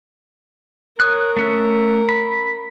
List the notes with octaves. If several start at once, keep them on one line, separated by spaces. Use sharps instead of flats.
A#4 C#5 D#6 F#6
A3 C#4 E5
B5